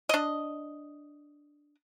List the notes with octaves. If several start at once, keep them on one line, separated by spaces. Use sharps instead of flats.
D4 D#5